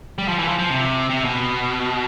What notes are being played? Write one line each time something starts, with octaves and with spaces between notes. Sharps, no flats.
G3
F3
E3
F3
F3
C3
C3
B2